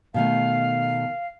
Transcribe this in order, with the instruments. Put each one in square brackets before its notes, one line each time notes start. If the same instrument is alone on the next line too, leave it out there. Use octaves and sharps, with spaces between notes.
[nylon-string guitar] B2 D#3 A3 [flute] F5